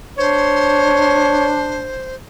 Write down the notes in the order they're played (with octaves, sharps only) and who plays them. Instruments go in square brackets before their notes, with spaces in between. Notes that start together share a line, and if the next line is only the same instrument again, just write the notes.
[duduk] D4 [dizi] C5 [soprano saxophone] C#5